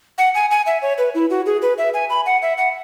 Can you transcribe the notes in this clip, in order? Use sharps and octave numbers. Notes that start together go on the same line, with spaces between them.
F#5
G#5
G#5
E5
C#5
B4
E4
F#4
G#4
B4
E5
G#5
B5
F#5
E5
F#5